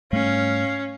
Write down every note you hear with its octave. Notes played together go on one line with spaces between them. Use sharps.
G#2 G3 A3 C#4 F5